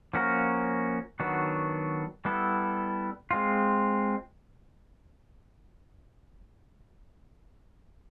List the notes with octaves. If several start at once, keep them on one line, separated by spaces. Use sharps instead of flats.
F3 A#3 C#4 F#4 A#4
D#3 F#3 B3 D4 F#4
G3 B3 E4 A4
G#3 C4 F4